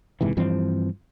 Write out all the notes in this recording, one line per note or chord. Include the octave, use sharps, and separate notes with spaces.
F#1 G#2 C3 E3
G2 E3 F3 C4